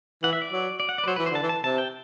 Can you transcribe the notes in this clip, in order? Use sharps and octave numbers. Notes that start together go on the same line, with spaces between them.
E3 F#5
E5
D5
F#3
D5
F#5
D5
B4
F#3 C5
E3 B4
C5
D3 A5
E3
A5
C3 A5
G5